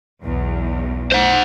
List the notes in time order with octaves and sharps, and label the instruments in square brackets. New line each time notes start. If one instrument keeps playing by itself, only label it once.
[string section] B1 E2
[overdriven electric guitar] C5 F#5